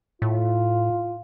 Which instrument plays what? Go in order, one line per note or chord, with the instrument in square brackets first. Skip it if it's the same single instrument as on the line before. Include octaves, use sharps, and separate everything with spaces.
[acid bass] A2 [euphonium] F4